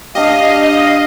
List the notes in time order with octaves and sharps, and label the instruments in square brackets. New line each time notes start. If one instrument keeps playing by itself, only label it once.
[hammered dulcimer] D4 G4 [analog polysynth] D#5 [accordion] F5